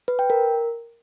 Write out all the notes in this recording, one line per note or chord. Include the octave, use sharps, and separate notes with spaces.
B4
G5
A#4